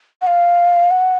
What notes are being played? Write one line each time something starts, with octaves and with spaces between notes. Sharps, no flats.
F#5
F5
F#5